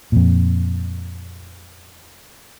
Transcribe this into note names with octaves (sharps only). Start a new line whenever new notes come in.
F2 A#2